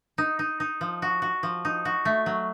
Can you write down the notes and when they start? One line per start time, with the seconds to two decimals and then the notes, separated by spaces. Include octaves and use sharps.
0.18 D#4
0.39 D#4
0.60 D#4
0.81 F3
1.02 F#4
1.22 F#4
1.43 F3
1.65 D#4
1.85 F#4
2.05 A3
2.26 F#3